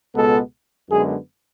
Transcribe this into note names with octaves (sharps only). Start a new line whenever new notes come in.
C#2 B2 G#3 B3 A4
F#2 D3 G#3 B3 G#4